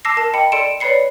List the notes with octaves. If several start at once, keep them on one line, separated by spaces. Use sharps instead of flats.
A5 D6 E6 A#6 C7
A#4 A5
D#5 G5 B5 C#7
A4 D5 C6 C#7 D7 E7
B4 C#5 D5 B5 C7 C#7